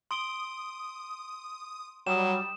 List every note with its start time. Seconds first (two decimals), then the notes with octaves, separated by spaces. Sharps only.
0.11 C6 D#6 D7 G7
2.07 F#3 G3 D#6 E7